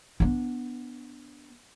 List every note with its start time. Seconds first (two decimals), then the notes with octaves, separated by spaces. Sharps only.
0.20 B3 D4